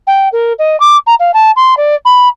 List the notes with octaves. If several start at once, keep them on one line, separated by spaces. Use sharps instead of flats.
G5
A#4
D#5
D6
A#5
F5
A5
C6
D5
B5